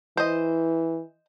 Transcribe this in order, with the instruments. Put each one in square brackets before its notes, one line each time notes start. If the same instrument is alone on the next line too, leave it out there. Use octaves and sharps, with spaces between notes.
[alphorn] E3 [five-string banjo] C5 D#5